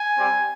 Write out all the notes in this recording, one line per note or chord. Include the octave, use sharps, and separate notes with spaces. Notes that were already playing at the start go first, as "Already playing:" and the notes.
Already playing: G#5
G3 C4 G4